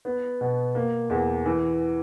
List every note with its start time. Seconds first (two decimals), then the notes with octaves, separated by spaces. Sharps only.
0.05 B3
0.41 B2
0.75 A#3
1.10 E2
1.46 E3